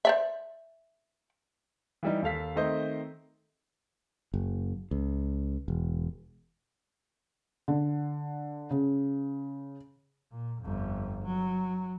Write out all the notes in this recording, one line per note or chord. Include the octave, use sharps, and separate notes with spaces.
C5 D5 E5
E3 G3 D#4
D#2 A4 F5 B6
D#3 A3 C4 C5 D#5
F#1
C#2
E1
D3
C#3
A#2
G1 F2
F#3